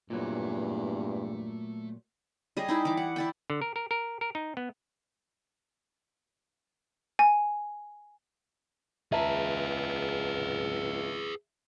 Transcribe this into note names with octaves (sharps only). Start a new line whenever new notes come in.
E2 G2 A#2 F#3 A3 B5
G3 G#4 D#5
D#4 E4 G5
E3 D6
F#5
E4 D5 G5
D3
A#4
A#4
A#4
A#4
D#4
B3
G#5
C#2 G#4 B4 E5 A5 A#5